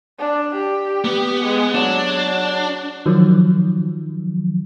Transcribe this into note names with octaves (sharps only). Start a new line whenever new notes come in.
D4
G4
B3
G#3
F#3 D4
D#3 F3 F#3